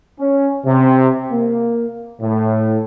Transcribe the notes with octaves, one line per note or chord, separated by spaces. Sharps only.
C#4
C3
A#3
A2